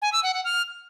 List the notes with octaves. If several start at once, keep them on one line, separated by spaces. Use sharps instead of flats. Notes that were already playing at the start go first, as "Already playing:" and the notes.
G#5
E6
F#5
F#5
F6